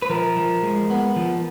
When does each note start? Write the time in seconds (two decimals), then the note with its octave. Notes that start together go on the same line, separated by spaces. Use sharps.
0.02 B4
0.10 F3 A#4
0.37 F3
0.63 G#3
0.90 B3
1.16 F3